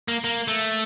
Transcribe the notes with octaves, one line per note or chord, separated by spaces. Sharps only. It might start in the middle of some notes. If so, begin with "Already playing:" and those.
A#3
A#3
A3